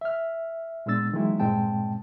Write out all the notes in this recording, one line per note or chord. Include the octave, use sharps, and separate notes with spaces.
E5 F6
A#2 G#3 B3 D4 E6 A6
D#3 E3 F#3 G#3 A#3 E4
G2 A#2 G#3 C4 G5 A5